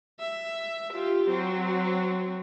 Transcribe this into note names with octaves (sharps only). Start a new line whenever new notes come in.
E5
F4 G4
F#3 C4